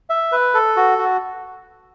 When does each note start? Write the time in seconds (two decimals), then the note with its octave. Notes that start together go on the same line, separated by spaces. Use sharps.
0.10 E5
0.32 B4
0.54 A4
0.76 F#4
0.98 F#4